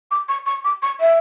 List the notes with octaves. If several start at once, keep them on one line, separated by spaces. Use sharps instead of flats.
D6
C#6
C#6
D6
C#6
E5